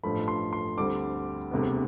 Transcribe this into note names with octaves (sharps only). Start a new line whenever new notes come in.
A1 G2 F3 A3 B5
C6
C6
D2 D3 G3 C4 D6
E1 D2 C3 G3 B3